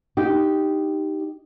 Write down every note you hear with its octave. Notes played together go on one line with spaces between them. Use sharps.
D#4 G4